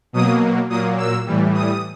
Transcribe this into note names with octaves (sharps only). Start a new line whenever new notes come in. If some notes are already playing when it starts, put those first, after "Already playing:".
B2 F#3 A#3 D#6
A#2 F#3 A#3 D#6
E6
A2 E3 G3
D#6